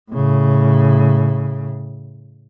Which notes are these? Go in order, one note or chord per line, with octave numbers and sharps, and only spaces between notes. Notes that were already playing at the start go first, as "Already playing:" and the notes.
A2 C#3